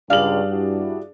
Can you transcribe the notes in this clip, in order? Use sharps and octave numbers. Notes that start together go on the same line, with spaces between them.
C#2 G2 D4 G#4 F5 F#7
E4 F#4 G4